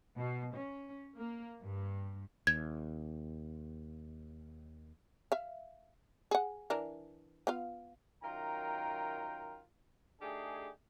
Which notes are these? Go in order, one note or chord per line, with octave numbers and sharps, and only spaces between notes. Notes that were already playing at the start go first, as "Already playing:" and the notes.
B2
C#4
A#3
G2
D#2 G#6
E5 F5
G#4 F#5
E3 D4 A#4
B3 F4 F5
F#2 D#3 F4 A#4 G5 A#5
A3 D4 D#4 G4 G#4